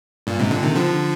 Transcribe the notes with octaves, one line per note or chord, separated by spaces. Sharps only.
G2 A#2
G#2 C3
A#2 D3
C3 D#3
D3 F3